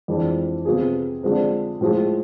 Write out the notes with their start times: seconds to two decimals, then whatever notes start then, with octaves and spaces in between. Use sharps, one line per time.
0.08 F2 E3 G#3 D4
0.65 C3 F3 B3 F4 G#4
1.23 D3 F3 G#3 C4
1.81 A2 F3 G#3